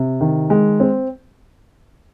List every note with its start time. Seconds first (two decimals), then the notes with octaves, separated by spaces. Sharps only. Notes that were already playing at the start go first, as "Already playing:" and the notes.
Already playing: C3
0.21 D#3
0.50 G#3
0.80 C4